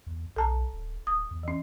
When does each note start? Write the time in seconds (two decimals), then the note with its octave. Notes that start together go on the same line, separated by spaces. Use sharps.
0.07 E2
0.36 B1 A4 A5 A#5
0.73 D1
1.07 D1 D#6
1.31 E2
1.43 E3 C#4